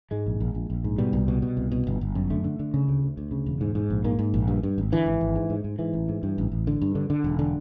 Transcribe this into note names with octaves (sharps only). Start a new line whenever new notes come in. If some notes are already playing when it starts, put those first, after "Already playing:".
G#2 G#3
A#1
A#1
A#1
A#1
G#2
B2 G3
C2
B2
B2
C2
B2
G1
G1
F#2
D3 A3
D3
D3
C#3
D2
D2
D2
C#3
E1
G#2
G#2
A#1
G#2 A#3
G#2
A#1
G2
G2
G#1
D3 E3
G#1
G#1
G#2
G#2
G#2
G#2 E3
A1
G#2
G2
A1
A1
D3
G2
D3
D3
E1
D3